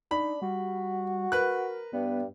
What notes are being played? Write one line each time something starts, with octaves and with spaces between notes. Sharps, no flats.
D4 D#4 B5
G3 F#4
A#4 B4 F#6
G2 B3